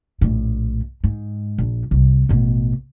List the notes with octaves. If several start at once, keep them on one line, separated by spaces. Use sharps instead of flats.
A#1 A2
G#2
A#1
C2
A1 B2